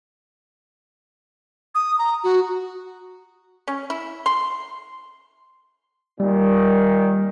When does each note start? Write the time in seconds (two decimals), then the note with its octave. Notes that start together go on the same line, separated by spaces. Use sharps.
1.75 D#6
1.99 A#5
2.24 F#4
3.68 C#4
3.90 E4
4.26 C6
6.20 A#2 D#3 G3